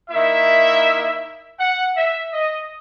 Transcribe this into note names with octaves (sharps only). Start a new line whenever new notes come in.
D#3 A#3 E4 E5
F#5
E5
D#5